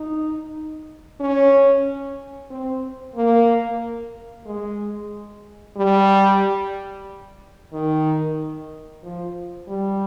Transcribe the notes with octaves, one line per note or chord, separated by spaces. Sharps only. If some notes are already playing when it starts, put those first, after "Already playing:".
Already playing: D#4
C#4
C4
A#3
G#3
G3
D#3
F3
G3